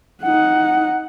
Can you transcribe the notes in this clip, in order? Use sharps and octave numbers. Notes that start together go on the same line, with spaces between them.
D#4 F#5